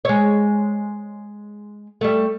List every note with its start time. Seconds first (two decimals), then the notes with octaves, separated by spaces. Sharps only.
0.05 G#3 C#5
2.01 G3 A3